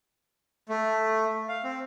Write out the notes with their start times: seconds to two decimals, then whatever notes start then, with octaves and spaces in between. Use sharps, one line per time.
0.69 A3
1.49 F5
1.64 C4